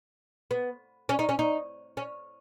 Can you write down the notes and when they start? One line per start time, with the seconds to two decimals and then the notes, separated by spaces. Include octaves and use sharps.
0.51 B3
1.09 C#4
1.19 D#4
1.29 C#4
1.39 D#4
1.97 C#4